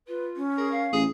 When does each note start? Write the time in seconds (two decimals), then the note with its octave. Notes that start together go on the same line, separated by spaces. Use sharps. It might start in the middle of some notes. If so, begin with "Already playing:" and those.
0.08 F4 B4
0.37 C#4
0.57 G#4 A#4
0.71 F5
0.93 A1 G#4